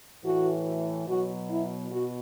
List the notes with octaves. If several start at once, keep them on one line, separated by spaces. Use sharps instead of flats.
A2 E3 F#4
B2 F#3 F#4
E4
B2 F#4